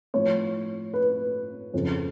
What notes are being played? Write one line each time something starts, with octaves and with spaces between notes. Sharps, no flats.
A2 F3 C#5
B4
F2 C#3 F3